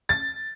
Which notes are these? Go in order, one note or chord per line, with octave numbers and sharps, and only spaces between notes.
A6